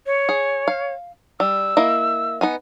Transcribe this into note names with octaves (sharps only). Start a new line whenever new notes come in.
C#5
G#4
F5
G3 E6
A#3 E4 D#5
B3 D#4 G#5